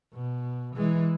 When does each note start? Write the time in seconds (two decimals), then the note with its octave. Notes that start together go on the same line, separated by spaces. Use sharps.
0.13 B2
0.76 E3 G#3